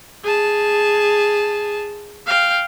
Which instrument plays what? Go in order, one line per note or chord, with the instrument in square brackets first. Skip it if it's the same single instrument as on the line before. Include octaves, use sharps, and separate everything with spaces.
[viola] G#4 A5
F5 G5